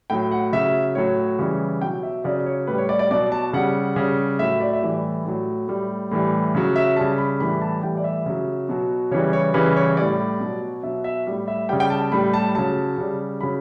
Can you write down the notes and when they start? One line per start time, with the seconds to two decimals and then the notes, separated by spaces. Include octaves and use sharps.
0.10 A2 F#3 G5
0.31 F#5
0.53 C#3 F#3 E5
0.95 A2 F#3 C#5
1.39 C#3 E3 G3
1.81 B2 F#3 G5
2.03 E5
2.24 C#3 F#3 D5
2.46 C#5
2.67 A2 G3 B4
2.78 C#5
2.89 D5
2.99 D5
3.11 B2 F#3 D5
3.32 A5
3.53 C#3 G3 F#5
3.96 C#3 G3
4.39 A2 F#3 E5
4.60 D5
4.73 E5
4.82 A2 E3 G3 D5
5.25 A2 F#3
5.68 A2 G3
6.11 A2 E3 G3
6.55 C#3 F#3
6.76 E5
6.96 C#3 G3 A5
7.18 B5
7.40 A2 E3 G3 B5
7.61 A5
7.83 A2 E3 G3 G5
7.97 D5
8.04 E5
8.26 C#3 F#3
8.69 B2 F#3
9.11 C#3 E3 G3 C#5
9.33 C#5
9.54 C#3 E3 G3 B4
9.76 C#5
9.97 A2 G3 D5
10.40 B2
10.45 F#3
10.83 B2 F#3 E5
11.04 E5
11.27 A2 G3
11.48 E5
11.69 C#3 G3 G5
11.80 G5
11.90 A5
12.01 A5
12.12 A2 G3 B5
12.34 A5
12.55 C#3 F#3 A5
12.98 C#3 G3
13.41 C#3 F#3 B5